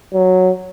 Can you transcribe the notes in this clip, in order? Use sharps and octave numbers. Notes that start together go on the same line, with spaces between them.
F#3